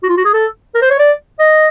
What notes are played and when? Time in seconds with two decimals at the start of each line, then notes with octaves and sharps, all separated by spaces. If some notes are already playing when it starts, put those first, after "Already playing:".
0.03 F#4
0.09 F4
0.17 F#4
0.25 G#4
0.33 A4
0.74 A#4
0.82 C5
0.90 C#5
0.99 D5
1.39 D#5